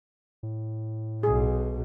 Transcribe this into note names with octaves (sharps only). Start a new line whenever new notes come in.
A2
B1 B2 G#4